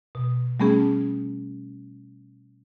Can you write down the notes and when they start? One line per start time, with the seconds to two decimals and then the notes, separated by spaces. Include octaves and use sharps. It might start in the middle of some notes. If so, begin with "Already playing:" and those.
0.15 B2
0.60 G3 A3 B3 C#4 G#4